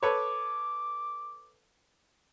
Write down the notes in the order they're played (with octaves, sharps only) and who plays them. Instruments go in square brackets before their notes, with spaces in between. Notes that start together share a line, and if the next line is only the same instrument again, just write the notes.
[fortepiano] A4 B4 C#5 [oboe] D6